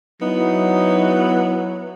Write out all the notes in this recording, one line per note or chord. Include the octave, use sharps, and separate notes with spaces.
F#3 B3 D#4 E4